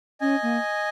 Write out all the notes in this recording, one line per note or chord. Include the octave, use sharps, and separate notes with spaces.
C#4 D#5 G#5
A#3